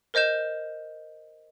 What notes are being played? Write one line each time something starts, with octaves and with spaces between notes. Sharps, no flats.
A#4 C5 D#5 G6 E7